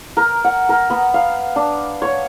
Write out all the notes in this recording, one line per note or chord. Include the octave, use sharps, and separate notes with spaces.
A#4
F#5
A#4
B3
F5
D4
C#5